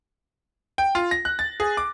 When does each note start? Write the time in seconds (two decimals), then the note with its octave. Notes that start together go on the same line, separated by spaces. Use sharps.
0.78 G5
0.95 F4
1.11 A#6
1.25 F#6
1.39 A6
1.60 G#4
1.77 D6